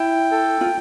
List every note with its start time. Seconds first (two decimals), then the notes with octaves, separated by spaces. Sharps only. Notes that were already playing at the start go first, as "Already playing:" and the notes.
Already playing: E4 G5
0.31 A4
0.61 F4